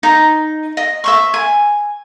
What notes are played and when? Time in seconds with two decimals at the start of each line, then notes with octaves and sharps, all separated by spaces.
0.03 D#4 D#5
0.77 D#5
1.04 E5 C6 C#6
1.34 G#5